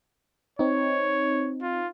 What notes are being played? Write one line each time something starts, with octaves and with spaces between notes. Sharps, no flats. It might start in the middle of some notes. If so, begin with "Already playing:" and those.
C4 D#4 C#5
F4